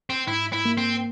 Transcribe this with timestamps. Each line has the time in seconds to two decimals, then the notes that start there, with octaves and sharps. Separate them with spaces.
0.10 C4
0.28 G#2 E4
0.53 E4
0.65 A#3
0.78 C4